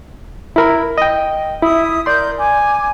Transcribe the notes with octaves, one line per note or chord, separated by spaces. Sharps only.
E4 A#4 B5
D#5 G5
E4 E5 D#6
A#4 D5 C6 G6
G#5 D6